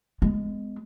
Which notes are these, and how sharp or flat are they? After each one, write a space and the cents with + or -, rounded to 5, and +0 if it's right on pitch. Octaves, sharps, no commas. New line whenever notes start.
G#3 +0 B3 +40